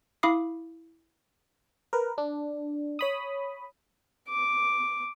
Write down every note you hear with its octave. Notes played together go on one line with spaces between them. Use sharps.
E4 F5 B5 D6 D#6 C7
A#4 B4
D4
C#5 B5 D#6
D6